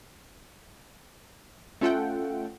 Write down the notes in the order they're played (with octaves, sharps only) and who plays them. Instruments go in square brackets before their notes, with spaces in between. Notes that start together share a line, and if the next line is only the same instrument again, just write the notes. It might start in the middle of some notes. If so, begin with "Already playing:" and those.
[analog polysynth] A3 C#4 F4 A4 F#5 G5